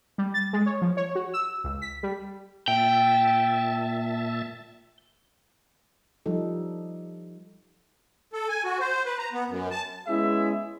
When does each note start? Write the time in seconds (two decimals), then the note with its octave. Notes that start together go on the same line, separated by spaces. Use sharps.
0.18 G3
0.34 A6
0.53 G#3
0.66 C#5
0.82 F3
0.97 C#5
1.15 F#4
1.34 E6
1.64 C#2
1.82 B6
2.03 G3
2.68 A#2 E5 G5 A5
6.26 F3 G3 D#4 A4
8.33 A4
8.49 G#5
8.64 F#4
8.80 C5
9.05 B4
9.18 A#5
9.33 B3
9.49 F#2
9.71 A5
10.08 G#3 B3 C#4 E4 G#4 E5